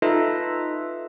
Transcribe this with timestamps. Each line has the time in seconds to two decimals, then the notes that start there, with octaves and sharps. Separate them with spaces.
0.02 D#4 F4 A4 B4 D#5 E5